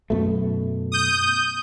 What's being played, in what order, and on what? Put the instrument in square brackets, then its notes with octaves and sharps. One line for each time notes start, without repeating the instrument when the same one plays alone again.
[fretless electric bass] F#2 B2 A3
[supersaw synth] D#6 G6